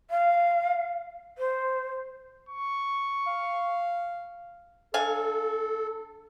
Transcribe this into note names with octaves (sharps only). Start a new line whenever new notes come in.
F5
C5
C#6
F5
D4 A4 F5 G#5